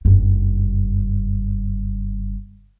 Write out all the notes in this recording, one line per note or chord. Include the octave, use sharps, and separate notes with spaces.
F#1 G2